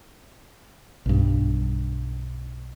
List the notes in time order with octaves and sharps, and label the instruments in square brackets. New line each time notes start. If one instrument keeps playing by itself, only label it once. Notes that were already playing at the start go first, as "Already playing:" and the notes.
[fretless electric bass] B1 G2